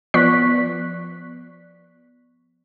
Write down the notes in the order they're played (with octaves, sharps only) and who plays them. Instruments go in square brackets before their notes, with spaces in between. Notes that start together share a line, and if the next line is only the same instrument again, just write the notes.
[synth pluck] F3 B3 D5 C#6 F#6 B6